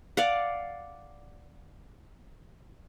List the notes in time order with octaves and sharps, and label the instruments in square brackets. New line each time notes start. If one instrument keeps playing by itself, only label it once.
[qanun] D5 F5 F#5